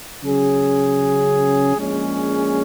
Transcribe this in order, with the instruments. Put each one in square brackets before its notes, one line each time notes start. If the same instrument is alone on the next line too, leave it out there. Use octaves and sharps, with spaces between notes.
[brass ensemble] C#3 F#3 C#4 G#4
A#1 A#2 G#3 C#4 G#4